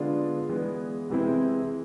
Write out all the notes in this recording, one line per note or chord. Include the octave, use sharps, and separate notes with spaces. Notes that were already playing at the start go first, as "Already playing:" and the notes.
Already playing: D3 G#3 B3 D4 F4
E3 G#3 B3
C3 E3 G#3 C4 E4